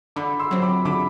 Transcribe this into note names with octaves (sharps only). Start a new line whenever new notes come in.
D3 B5 D6
C6 E6
F#3 C4
B5 D6
D3 B5 D6